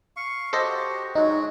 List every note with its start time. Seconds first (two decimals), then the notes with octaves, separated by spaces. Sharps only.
0.17 F5 C#6
0.53 F#4 G4 A4 C5 D#5
1.15 F#3 G#3 D#4 F#4